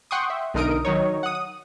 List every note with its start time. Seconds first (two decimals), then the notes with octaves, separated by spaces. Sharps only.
0.11 F#5 G5 C6 C#6 D#6
0.30 E5
0.54 B1 D3 D#4 A#4 D#6 D7
0.85 D#3 F#3 D#4 C#5
1.23 F#5 D#6
1.35 D#6